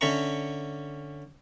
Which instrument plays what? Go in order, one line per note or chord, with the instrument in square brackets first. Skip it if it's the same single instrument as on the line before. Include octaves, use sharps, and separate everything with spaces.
[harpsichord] D3 C#4 E5 A#5 C#6